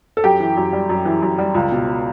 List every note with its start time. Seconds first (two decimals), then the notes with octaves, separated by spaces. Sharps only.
0.17 A4
0.24 F#2 G4
0.40 E3
0.57 F#2
0.73 G3
0.89 F#2
1.05 E3
1.22 F#2
1.38 G3
1.54 C#2
1.72 B2